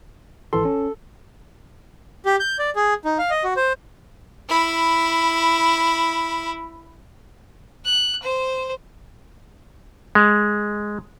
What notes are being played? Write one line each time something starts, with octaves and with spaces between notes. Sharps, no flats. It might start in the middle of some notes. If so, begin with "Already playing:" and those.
G#1 E3 A4 C6
C#4
G4
G6
D5
G#4
D#4
F5
D#5
F#4
C5
E4 B5
F#6
C5
G#3